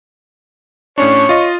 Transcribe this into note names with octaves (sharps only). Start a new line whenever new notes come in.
A2 C#4 D4 C#5
F4 D#5